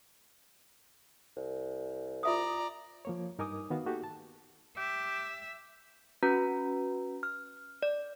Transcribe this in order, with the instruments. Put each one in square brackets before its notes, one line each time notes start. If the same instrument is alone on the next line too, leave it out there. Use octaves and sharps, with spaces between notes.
[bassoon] C2
[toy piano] F4 E5 D#6 [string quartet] D5 A#5
[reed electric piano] F3 A#3 C#5
G2 D#4 A#4 G#5 D6 D#6
D#3 B3 F#4 F5
A#3 D#4 F#4 G4 A4
A5
[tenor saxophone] G4 [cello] E5
[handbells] C#4 F#4 B4 A#5
F6
D5